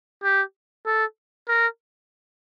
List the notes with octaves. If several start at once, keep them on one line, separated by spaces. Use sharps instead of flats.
G4
A4
A#4